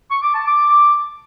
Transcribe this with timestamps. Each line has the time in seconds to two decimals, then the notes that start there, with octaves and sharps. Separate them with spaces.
0.10 C#6
0.22 D6
0.34 A5
0.45 D6